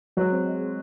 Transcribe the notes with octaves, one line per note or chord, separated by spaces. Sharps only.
F#3 G#3
C4
G#3
G#3